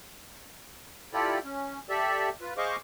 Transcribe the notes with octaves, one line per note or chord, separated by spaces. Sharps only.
E4 F4 G4 A4 D5
C#4
G4 A4 D5 E5
F4 B4
G#4 C5 D#5 F5 C#6 D6